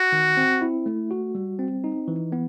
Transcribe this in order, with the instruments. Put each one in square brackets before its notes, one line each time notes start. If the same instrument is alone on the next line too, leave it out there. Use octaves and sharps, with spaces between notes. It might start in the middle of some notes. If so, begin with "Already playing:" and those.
Already playing: [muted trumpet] F#4
[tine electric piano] D#3
C4
E4
A3
F#4
G3
C4
D#4
E3
B3